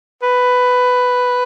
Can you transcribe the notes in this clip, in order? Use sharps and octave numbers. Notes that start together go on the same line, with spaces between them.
B4